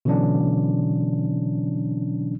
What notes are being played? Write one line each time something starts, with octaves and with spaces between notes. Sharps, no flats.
B2 D3 E3 F#3 C#4 D4